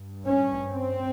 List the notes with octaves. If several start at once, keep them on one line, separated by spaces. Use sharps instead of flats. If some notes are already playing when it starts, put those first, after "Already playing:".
Already playing: G2
C#4
C4